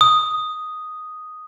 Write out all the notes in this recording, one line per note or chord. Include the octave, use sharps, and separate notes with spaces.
D#6